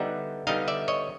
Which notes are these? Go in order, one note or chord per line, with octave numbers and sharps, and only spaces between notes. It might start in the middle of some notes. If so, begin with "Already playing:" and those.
Already playing: D3 G3 B3 D#4 E5 F#5
D3 G3 B3 D#4 D#5 F5
D5 E5
C#5 D#5